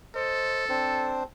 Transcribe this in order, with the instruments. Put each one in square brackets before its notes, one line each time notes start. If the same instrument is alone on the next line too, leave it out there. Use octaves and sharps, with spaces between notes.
[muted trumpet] A4 [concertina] C5 D#5
[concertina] C4 D4 C5